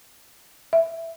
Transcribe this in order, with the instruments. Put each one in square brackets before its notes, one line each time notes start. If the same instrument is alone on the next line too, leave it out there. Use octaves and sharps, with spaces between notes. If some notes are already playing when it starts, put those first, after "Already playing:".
[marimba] E5